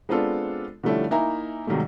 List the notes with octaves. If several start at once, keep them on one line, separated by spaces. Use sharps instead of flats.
G#3 B3 C4 D4 F4 A4
D3 F3 G3 A3 C#4 E4
A#3 D#4 E4 E5 G#5 A#5
G#2 C3 D#3 F#3 G3 A3